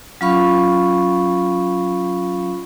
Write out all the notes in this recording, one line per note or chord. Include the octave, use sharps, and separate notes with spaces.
F#3 C#4 F4 F5 B5 C#6